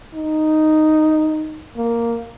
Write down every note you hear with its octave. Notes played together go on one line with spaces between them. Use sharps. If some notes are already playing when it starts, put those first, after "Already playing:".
D#4
A#3